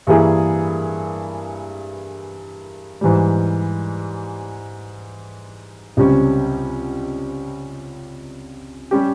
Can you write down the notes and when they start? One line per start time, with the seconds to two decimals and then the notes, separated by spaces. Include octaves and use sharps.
0.07 G2 E3 A#3 E4 G#4
3.01 G#2 E3 G3
5.97 C#2 C3 G3 C#4
8.91 G3 C#4 G4